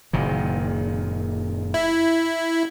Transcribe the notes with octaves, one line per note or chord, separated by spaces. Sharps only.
F#1 A#2 D#3
E4